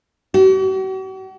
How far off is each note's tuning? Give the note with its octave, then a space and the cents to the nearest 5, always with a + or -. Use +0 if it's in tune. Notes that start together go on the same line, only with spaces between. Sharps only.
F#4 +45